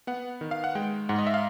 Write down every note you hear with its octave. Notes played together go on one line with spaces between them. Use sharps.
B3 F#5
D#3
F5
F#5
G#3 G5
G#2 F#5
D#5
E5
F5